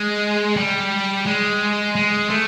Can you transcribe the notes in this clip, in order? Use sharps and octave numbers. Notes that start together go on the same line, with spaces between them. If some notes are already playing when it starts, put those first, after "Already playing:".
Already playing: G#3
G3
G#3
G#3
A3